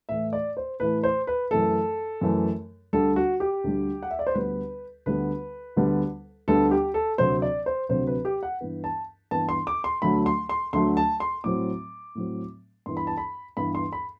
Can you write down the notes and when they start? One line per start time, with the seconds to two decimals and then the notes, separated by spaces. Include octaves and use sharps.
0.09 A2 E3 A3 E5
0.33 D5
0.57 C5
0.80 A2 E3 A3 B4
1.04 C5
1.27 B4
1.51 F#2 E3 A3 A4
2.21 F#2 E3 A3
2.93 D2 D3 G3 A4
3.16 F#4
3.40 G4
3.64 D2 D3 G3
4.03 F#5
4.11 E5
4.19 D5
4.27 C5
4.34 D2 D3 G3 B3 B4
5.06 D2 D3 G3 B3 B4
5.76 D2 D3 G3 B3
6.48 D2 D3 G3 B3 A4
6.71 G4
6.94 A4
7.18 D2 C3 F#3 C4 C5
7.42 D5
7.66 C5
7.89 D2 C3 F#3 C4 C5
8.07 B4
8.25 G4
8.43 F#5
8.61 G2 E3 B3
8.84 A5
9.31 G2 E3 B3 A5
9.49 C6
9.67 D6
9.84 C6
10.02 D2 D3 F#3 A3 B5
10.26 C6
10.49 C6
10.73 D2 D3 F#3 A3 C6
10.97 A5
11.20 C6
11.44 A2 F#3 C4 D6
12.15 A2 F#3 C4
12.86 G2 E3 B3 C6
12.97 B5
13.07 A5
13.17 B5
13.57 G2 E3 B3 B5
13.75 C6
13.93 B5